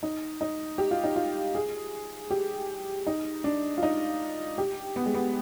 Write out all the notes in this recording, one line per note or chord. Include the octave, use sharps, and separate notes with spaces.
D#4
D#4
G4
F4
D#4
F4
G#4
G4
D#4
D4
F4
D#4
G4
B3
G#3
B3